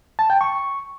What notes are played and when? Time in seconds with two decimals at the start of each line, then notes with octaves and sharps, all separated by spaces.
0.19 A5
0.30 G5
0.41 C#6